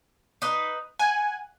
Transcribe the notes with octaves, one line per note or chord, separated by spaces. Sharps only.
D#4 B4
F#5 G#5